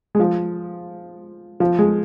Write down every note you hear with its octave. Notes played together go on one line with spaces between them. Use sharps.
G#3
F3
F3
G#3